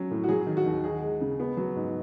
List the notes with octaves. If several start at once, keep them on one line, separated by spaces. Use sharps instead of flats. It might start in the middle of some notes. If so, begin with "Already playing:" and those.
Already playing: F#3 C#4
A2
F#4
F#3 G#4
D#3
F#4
D#2
D#4 G#4
G#3
C#3
B3
F#3
G#2